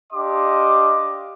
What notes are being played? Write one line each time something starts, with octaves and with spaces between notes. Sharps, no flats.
D4 G4 D#5 F5 C6 D6